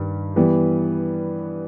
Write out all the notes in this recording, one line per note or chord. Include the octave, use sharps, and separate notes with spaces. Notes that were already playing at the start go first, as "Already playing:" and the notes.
Already playing: G2 D#3 G3
E3 G3 B3